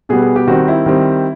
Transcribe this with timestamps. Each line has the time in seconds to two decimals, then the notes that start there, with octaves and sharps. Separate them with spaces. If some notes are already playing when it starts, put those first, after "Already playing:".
0.09 B2 G3 B3 G#4
0.22 G#4
0.36 G4
0.47 D#3 G3 C4 F#4
0.68 E4
0.86 D#3 G3 C4